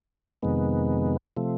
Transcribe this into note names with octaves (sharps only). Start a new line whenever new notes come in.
F2 C3 D#3 G#3 B3
C3 F3 A3